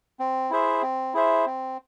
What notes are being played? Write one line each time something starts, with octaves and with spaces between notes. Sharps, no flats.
C4
E4 G#4 C5 E5
C4
E4 G#4 C5 E5
C4